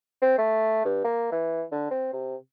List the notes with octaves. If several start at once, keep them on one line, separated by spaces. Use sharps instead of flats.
C4
A3
G2
A#3
E3
D3
C4
C3